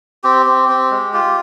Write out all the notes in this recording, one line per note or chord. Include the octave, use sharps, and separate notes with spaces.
C4 G4
C4
C4
G#3
F4 G4